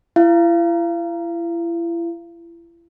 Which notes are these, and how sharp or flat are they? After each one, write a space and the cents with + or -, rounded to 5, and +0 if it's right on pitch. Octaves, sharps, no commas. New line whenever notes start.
E4 +35 F5 -30